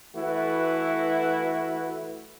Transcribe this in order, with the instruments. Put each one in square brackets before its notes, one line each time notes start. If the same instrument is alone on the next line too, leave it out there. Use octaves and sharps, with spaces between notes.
[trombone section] E3 A3 E4 F#4 B4